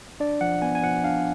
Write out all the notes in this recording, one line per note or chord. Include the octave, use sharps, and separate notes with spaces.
D4 D5
F3 F#5
B3 G#5
G#5
F3 F#5
D4 F5